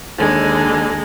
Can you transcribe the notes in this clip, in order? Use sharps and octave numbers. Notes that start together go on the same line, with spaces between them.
D#2 D3 G#3